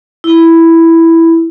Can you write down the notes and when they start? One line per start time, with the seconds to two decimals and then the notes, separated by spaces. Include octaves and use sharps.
0.24 E4